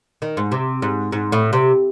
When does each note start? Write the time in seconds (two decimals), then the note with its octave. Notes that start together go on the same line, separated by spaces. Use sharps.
0.22 D#3
0.37 G#2
0.52 C3
0.82 G#2
1.12 G#2
1.32 A2
1.53 C3